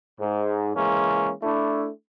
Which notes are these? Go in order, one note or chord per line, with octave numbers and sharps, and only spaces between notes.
G#2
E3 G#3 A#3 C#4
A3 D4 E4